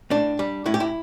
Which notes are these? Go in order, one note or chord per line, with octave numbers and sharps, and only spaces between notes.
A2 D4
G3
A2 E4
G4
E4